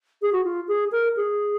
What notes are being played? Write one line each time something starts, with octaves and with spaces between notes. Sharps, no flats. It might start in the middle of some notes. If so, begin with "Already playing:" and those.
G#4
F#4
F4
G#4
A#4
G#4